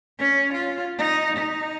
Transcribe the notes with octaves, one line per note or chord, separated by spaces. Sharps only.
C#4
F4
D#4
D#4